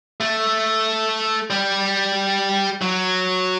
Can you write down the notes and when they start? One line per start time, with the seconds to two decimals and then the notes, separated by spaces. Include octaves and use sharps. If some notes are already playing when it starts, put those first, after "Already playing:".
0.20 A3
1.50 G3
2.82 F#3